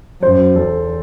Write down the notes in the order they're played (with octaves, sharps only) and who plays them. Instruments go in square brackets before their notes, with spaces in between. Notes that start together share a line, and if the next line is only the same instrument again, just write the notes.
[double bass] F#2 [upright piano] C5
[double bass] E2 [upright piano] A4